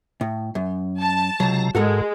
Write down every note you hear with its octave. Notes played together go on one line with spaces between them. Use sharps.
A2
F#2
A5
C#2 C3 F#3 A#5
G#2 G#3 F#4 A4 A#4